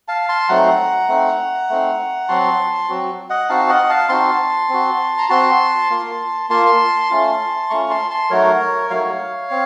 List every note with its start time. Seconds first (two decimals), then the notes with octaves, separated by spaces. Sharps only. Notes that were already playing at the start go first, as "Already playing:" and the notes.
0.08 F5 A5
0.29 A5 C6
0.49 F#3 A3 C4 D#4 F#5 A#5
1.08 A3 C4 D#4
1.69 A3 C4 D#4
2.29 F#3 C4 F#4 A5 C6
2.89 F#3 C4 F#4
3.30 D#5 F#5
3.49 C4 D#4 F#4 F5 A5
3.69 D#5 F#5
3.90 F5 A5
4.09 C4 D#4 F#4 A5 C6
4.69 C4 F#4
5.18 A#5
5.30 C4 F#4 A5 C6
5.90 A#3 F4
6.50 A#3 F4 A5 C6
7.11 A3 C#4 F4
7.70 A3 C#4 F4 A#5 C#6
7.90 A5 C6
8.11 A5 C6
8.30 F#3 A3 D#4 F#4 A#4 C#5
8.90 F#3 A3 D#4 F#4 C#5 F5
9.51 C4